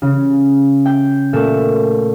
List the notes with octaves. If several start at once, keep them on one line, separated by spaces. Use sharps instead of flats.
C#3
G5
A#2 A3 E7